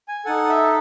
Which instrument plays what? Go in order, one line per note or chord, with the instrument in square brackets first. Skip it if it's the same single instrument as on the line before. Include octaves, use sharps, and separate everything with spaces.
[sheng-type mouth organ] G#5
D#4 A4 F#5
E5